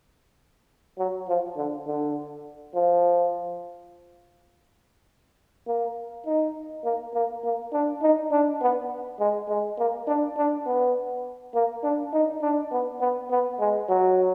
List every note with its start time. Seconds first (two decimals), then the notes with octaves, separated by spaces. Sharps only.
0.99 F#3
1.28 F3
1.57 D3
1.87 D3
2.75 F3
5.68 A#3
6.26 D#4
6.84 A#3
7.14 A#3
7.44 A#3
7.73 D4
8.02 D#4
8.32 D4
8.62 B3
9.20 G#3
9.49 G#3
9.79 A#3
10.07 D4
10.37 D4
10.66 B3
11.54 A#3
11.83 D4
12.13 D#4
12.42 D4
12.72 B3
13.01 B3
13.30 B3
13.60 G#3
13.89 F#3